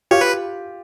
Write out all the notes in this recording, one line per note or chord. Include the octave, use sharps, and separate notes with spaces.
F4 G4 C#5
B4